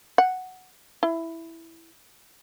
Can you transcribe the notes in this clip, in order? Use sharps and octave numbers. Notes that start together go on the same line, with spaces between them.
F#5
E4